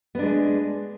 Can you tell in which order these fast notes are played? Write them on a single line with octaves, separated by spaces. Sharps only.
B3 D4 G#3